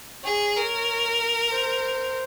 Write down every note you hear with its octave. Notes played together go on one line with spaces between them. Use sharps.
G#4 C#5
A#4
C5